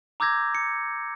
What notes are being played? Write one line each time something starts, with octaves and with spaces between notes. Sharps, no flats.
A#5 D6 E6 G6 G#6 A#6
C#7